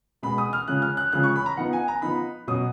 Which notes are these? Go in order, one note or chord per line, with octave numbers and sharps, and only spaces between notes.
B2 G#3 B3 B5
D#6
F6
C#3 F3 G#3 C#4 F#6
F6
F#6
C#3 F3 G#3 C#4 F#6
C#6
B5
A#5
F3 B3 D#4 F#5
G#5
A#5
F3 B3 D#4 B5
B2 F#3 C#4 D#6